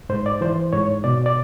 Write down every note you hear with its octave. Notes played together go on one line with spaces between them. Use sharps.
G#2 C5
D5
E3 C5
G#2 C#5
B2 D5
D5